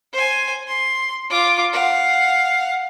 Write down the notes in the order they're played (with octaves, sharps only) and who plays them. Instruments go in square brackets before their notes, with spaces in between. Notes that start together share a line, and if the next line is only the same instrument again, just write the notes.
[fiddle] C5 G#5
C6
F4 D6
F5 F#5